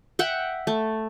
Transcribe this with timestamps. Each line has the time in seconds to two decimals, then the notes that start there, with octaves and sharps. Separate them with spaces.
0.19 E5 F#5 G5
0.67 A3